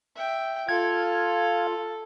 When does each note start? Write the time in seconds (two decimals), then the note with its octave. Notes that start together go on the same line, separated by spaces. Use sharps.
0.15 E5 G5
0.69 F4 A4 F5 G#6